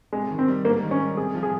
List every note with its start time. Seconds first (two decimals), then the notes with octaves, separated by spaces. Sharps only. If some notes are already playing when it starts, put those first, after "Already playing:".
0.13 C3 G#3
0.31 D#3
0.39 C4
0.48 G3
0.64 G#2 A#3
0.83 D#3
0.91 C#4
0.99 G3
1.16 C3 G#4
1.35 F3
1.43 G#4